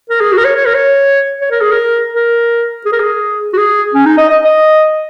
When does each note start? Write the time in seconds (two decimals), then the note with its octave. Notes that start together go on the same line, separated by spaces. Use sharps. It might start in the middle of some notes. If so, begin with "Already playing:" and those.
0.10 A#4
0.21 G#4
0.32 F#4
0.38 A#4
0.44 C#5
0.56 C#5
0.65 A#4
0.74 C#5
1.41 C#5
1.51 A#4
1.61 G#4
1.72 A#4
2.13 A#4
2.86 G#4
2.92 A#4
3.00 G#4
3.53 F#4
3.57 G#4
3.94 C#4
4.06 D#4
4.18 D#5
4.29 D#5
4.44 D#5